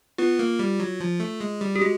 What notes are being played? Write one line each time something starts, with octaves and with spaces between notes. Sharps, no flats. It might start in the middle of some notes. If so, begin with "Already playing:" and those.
B3 F4
A#3
G3
F#3
F3
A3
G#3
G3
G4
G#3 F#4